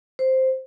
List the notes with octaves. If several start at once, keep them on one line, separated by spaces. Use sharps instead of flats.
C5